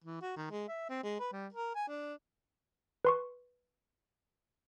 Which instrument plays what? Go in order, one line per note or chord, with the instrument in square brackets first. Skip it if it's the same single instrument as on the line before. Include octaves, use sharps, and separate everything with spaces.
[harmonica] E3
F#4
D#3
G#3
E5
C4
G#3
B4
G3
A#4
G#5
D4
[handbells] B4 C6 C#6